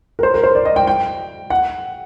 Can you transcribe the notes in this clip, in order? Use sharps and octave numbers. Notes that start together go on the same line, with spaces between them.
A#4
C5
A#4
C5
D5
D#5
G5
G5
F#5